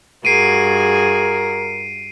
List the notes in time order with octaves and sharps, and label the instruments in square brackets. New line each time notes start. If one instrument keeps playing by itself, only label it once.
[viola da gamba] G2 F#4 G#4 [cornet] A#4 [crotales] C7 D7 D#7